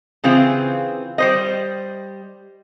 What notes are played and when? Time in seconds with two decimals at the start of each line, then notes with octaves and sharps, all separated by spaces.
0.24 C#3 E3 C4 F4 G#4
1.18 G3 C5 D#5